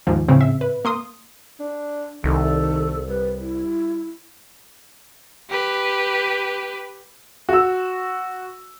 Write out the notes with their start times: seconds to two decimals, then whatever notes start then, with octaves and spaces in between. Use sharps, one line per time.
0.07 D#2 G#2 F3
0.28 A2 C#3 C4
0.41 E5
0.61 B4
0.85 A#3 C6 D#6
1.60 D4
2.24 C2 D#3 A4
3.08 G3 B4
3.39 E4
5.49 G4 B4
7.49 F#4 E6